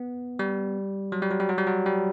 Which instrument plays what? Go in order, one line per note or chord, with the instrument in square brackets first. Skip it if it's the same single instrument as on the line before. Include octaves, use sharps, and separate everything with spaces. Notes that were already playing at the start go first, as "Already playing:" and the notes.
Already playing: [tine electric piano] B3
G3
F#3
G3
F#3
G3
F#3
G3
F#3
G3